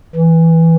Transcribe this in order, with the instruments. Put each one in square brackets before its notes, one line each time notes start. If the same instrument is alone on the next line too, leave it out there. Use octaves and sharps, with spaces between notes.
[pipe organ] E3